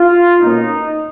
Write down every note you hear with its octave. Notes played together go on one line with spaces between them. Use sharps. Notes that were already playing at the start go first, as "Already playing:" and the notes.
Already playing: F4
B2 A#3 C#4 D#4